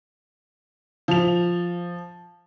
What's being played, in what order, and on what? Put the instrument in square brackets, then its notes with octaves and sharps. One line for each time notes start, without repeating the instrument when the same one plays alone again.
[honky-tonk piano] F3 F7